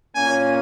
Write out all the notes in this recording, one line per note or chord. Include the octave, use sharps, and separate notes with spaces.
A#2 A#3 C#4 G#5